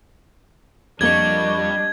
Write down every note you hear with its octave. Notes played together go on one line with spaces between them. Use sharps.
F2 G3 A#3 D4 D#5 C#6 G#6